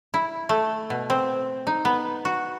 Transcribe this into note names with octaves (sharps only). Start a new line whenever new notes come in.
E4
A3
B2
C4
D#4
B3
F#4